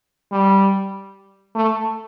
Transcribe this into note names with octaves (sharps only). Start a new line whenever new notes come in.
G3
A3